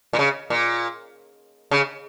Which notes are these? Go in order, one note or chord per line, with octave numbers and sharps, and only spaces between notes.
A#2
C#3
A#2
C#3